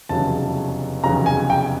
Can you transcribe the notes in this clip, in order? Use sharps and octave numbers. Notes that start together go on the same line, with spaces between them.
F1 E2 C#3 F#3 A5
F1 E2 C#3 F#3 A#5
G#5
G5